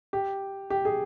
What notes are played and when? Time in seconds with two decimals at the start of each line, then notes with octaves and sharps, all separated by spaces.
0.13 G4
0.70 G4
0.85 G#4